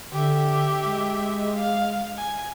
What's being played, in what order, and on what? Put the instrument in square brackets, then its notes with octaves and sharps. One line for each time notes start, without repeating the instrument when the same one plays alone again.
[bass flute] D3 [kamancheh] G4 E5
[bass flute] G#3
[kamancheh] F5
G#5